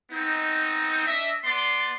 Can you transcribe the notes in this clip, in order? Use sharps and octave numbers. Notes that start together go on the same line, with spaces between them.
B3 C4 D#4
D4 D#5 E5
B3 D5 C6